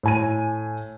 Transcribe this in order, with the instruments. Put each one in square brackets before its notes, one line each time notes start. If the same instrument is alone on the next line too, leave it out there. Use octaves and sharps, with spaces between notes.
[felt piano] A2 G#5 D#7